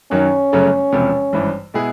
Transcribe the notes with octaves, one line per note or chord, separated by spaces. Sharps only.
F#2 D#3 F#3 C#4
G1 F#2 C#3 F#3 A3
E1 E2 C3 F3
G#1 G2 E3
B2 G#3 B3 E4 G#4